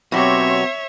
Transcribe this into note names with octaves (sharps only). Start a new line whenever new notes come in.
B2 F#3 C4 G4 C#5 E5